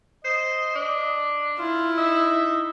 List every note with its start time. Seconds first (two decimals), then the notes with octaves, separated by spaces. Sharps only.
0.25 C5 D#5
0.75 D4
1.58 E4 F4
1.98 D#4 E5